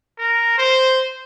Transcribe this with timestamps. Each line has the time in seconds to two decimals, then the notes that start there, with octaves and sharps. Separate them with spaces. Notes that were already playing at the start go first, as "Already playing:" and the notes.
0.18 A#4
0.58 C5